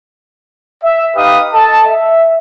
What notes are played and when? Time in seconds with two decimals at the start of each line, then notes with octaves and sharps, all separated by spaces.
0.83 E5
1.16 D#4 G4 B4 F5 D#6
1.54 A4 D#5 A5
1.87 E5